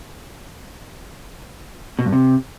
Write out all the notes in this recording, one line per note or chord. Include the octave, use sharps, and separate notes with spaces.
B2
G2
C3